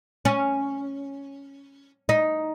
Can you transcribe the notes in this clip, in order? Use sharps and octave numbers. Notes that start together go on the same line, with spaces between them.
C#4
D#4